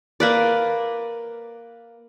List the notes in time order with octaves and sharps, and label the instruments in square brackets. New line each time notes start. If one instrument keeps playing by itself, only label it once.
[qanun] A#3 B4 D5